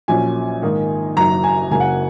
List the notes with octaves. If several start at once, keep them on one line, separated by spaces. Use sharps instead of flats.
A#1 A#2 F#3 C#4 G#5
G#2 D#3 A#3 D#4
F#1 F#2 F#3 D#4 A#5
G#5
F#1 F#2 C#3 F#3 A#3 G#5
F#5